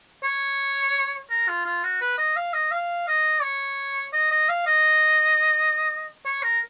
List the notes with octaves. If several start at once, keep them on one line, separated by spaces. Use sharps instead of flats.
C#5
A#4
F4
F4
F#4
B4
D#5
F5
D#5
F5
D#5
C#5
D#5
D#5
F5
D#5
C#5
A#4